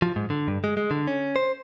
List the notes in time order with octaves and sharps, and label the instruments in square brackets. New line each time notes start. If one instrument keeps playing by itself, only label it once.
[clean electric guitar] F3
G#2
D3
G2
G#3
G#3
D3
C#4
C5